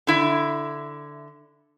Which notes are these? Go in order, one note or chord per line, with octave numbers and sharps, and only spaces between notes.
D3 E4 E5